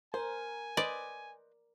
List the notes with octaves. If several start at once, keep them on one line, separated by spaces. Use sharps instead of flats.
A#4 C5 G#5
B4 C5 D5 D#5